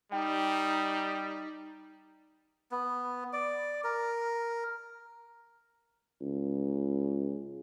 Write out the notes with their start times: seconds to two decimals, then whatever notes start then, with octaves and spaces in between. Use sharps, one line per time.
0.12 G3 D#4 G5
2.72 B3
3.33 D5
3.84 A#4
6.21 C#2